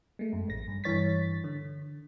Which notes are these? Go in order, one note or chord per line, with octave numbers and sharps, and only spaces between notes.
G#3 A3
F#2
A1 A#6
G2
G2 E3 C#5 A6 B6
D3